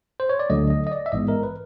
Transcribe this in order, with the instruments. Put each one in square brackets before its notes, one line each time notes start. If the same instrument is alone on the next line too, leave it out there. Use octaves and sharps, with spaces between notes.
[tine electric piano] C5
C#5
D5
D2 D3 F#3 A3 D#5
D#5
D#5
D5
E5
A1 G#2 E3 G#3 B3 D#5
A#4
B4